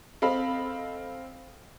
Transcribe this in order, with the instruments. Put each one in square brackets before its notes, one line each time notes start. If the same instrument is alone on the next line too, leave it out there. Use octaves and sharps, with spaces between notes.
[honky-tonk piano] C4 A4 D#5 F5 B5